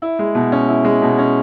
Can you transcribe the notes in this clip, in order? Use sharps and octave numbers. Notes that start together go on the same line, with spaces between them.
E4
G#3
B2
C#4
E4
G#3
B2
C#4